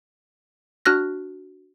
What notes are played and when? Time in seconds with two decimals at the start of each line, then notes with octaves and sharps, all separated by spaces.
0.85 D4 F#4 F6 F#6 A#6